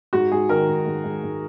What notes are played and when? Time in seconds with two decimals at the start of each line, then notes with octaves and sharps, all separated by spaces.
0.13 G#2 F#4
0.31 G#2 G#4
0.49 D#3 A#4
0.67 G#2
0.86 G#2
1.04 G#2
1.23 G#2